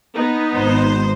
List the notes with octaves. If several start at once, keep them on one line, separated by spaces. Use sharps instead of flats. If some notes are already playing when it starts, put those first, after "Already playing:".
B3 D#4
G#1 C5